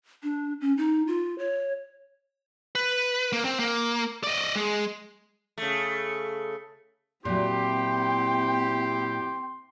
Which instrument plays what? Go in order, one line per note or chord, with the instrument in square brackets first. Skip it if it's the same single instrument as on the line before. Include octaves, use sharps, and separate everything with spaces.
[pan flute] D4
C#4
D#4
F4
C#5
[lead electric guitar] B4
A#3
C4
A#3
D5 D#5
G#3
[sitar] C#3 A3
[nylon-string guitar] A#2 F#3 [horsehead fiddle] C4 G5 [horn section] E4 G4 [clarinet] C6